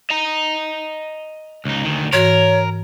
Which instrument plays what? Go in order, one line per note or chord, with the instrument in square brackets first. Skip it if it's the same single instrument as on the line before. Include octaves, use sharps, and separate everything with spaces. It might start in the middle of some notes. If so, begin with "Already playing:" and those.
[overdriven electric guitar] D#5 A#5
C#2 D#4
D2 D#3
[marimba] G#2 E3 F#4 [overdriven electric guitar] A#4 [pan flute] C#5